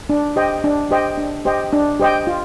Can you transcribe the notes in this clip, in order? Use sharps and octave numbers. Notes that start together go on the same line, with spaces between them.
D4
G4 C5 D#5 G5
D4
G4 C5 D#5 G5
D4
G4 C5 D#5 G5
D4
G4 C5 D#5 G5
F4